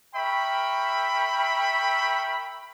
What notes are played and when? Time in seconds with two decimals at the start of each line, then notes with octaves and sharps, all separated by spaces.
0.15 A#4 E5 G5 B5 C#6